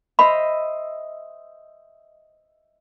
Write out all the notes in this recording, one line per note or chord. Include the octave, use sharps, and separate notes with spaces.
C5 D#5 E5 B5